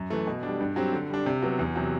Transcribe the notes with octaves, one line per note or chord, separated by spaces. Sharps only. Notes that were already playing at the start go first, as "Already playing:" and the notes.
Already playing: F#2
E3 A3
B2
G3 D4
G2
F#3 C4 G4
D3
G3 D4
C3
F#3 B3
E2
C3 F#3